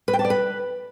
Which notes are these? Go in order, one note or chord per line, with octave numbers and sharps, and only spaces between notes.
B4
G5
A5
D5
B4